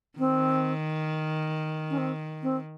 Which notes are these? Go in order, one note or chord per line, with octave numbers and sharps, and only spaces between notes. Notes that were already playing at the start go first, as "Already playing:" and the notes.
D#3 C4
C#4
C4
C4